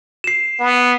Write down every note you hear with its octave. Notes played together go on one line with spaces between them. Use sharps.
C7 E7
B3